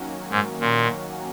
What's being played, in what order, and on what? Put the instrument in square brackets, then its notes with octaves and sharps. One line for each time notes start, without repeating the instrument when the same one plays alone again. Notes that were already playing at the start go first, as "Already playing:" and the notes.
Already playing: [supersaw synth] D#3 F#3 A#3 C#4 F#4
[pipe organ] G#2
A#2